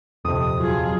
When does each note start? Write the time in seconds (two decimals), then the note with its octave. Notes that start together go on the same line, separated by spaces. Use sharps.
0.25 D#1 F2 C3 D#6
0.59 F#3 F4 G#4